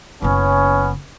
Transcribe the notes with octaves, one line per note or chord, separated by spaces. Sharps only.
F#1 C#3 B3 C#4